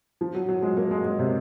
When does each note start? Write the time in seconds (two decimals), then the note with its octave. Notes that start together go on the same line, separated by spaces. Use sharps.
0.21 F3
0.35 F#3
0.49 F#3
0.62 G#3
0.77 A#3
0.91 G#3
1.05 G#3
1.19 C3